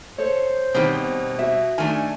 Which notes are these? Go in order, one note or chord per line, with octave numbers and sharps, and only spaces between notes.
A4 C5 C#5
B2 D#3 G3 C4
F#4 E5
D#3 A3 D4 G#5